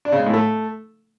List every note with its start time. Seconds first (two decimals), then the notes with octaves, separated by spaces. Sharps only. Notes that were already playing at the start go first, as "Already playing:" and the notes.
0.05 D4
0.12 C#3
0.19 G#3
0.26 A2
0.34 A3